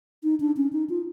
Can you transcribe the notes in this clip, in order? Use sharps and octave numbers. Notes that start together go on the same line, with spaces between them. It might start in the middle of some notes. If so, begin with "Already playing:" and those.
D#4
D4
C#4
D#4
F4